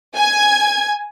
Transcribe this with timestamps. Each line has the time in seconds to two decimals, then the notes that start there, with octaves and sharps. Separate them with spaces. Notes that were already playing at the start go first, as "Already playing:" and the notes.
0.15 G#5 G#6